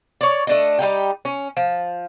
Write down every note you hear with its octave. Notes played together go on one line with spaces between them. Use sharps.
C#5 D5
A3 D4 D#5
G3 A3 D#4 G4
C#4
F3